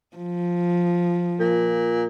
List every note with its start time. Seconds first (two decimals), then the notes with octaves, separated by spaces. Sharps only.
0.17 F3
1.40 A#2